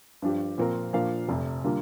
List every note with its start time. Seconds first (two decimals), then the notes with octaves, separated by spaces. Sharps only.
0.22 G2 F3 D4 G4
0.58 A#2 F3 C4 F4 A#4
0.93 A#2 F3 D4 A#4 F5
1.29 F1 F2 C3
1.64 D3 G3 A#3 F4